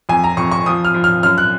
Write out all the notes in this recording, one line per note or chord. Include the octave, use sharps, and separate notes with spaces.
F2 G#5
A#5
F2 C#6
C#6
F3 D#6
F6
F3
F6
F#2 F6
F#6